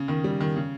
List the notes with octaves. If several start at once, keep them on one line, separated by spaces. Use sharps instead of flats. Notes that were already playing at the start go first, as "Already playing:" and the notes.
Already playing: C#3
D#3
G3
D#3
C#3